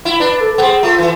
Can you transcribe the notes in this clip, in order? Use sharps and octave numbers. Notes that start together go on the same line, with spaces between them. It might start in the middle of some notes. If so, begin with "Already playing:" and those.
E4
D4 B4
A4
A4
B3
C4 G#4
A3 F4
E3